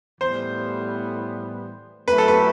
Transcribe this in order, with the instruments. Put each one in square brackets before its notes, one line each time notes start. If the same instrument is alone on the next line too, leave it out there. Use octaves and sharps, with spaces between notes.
[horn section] A2 E3 G3 B3 [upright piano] C5
[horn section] F#3 A3 E4 G4 [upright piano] B4
[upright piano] A4
B4